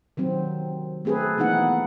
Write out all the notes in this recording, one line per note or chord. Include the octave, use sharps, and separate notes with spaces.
D#3 F#3 C4
A3 C4 G#4 A4 B4
E3 A#3 B3 D#4 F#5